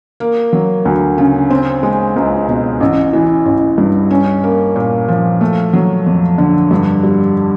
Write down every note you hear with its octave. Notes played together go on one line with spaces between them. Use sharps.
A#3
F#3
D2
C#3
C4
G#3
C#2
B2
A1
E3
A1
G2
C#4
A#3
A#2
F3
A3
F#3
F2
D3
G2
G3